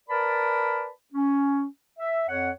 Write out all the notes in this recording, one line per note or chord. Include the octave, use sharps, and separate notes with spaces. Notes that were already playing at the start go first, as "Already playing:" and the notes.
A#4 B4 D5 A5 B5
C#4
E5
F2 C#5 F#5